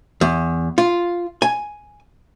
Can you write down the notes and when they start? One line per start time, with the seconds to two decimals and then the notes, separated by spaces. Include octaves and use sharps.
0.21 E2
0.78 F4
1.42 G#5